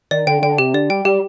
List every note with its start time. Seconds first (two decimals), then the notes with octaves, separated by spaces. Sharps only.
0.11 D#3 D5
0.27 D3 G5
0.42 D3 G5
0.58 C3 G4
0.74 D3 D5
0.90 G3 G5
1.05 G3 G4